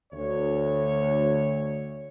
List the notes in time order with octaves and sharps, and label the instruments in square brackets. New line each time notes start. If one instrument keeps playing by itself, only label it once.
[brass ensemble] D2 C#5